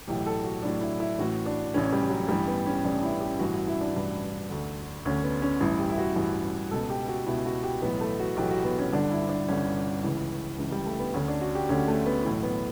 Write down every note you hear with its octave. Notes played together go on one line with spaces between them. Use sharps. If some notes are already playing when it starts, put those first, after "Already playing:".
B1 A2 E3 G4
A4
F#4
B1 A2 E3 D4
E4
E4
A1 A2 E3 F#4
D4
A1 A2 E3 C#4
G3
F#3
A1 G2 E3 G3
B3
C#4
A1 G2 E3 D4
E4
G4
A1 G2 E3 F#4
F#4
E4
D4
A1 G2 E3
D2 D3
D2 D3 C#4
B3
C#4
A1 G2 E3 E4
G4
E4
F#4
A1 G2 E3
C#2 B2 A4
G4
F#4
C#2 B2 E4
F#4
G4
B1 A2 E3 B3
A3
F#4
B1 A2 E3 G4
F#4
B3
C#4
G1 G2 D3 D4
E4
D4
G1 G2 D3 C#4
C#2 C#3 E3
C#2 C#3 E3
G3
A3
B3
D2 D3 C#4
D4
F#4
G4
D2 D3 C#4
A3
B3
B1 A2 E3
B3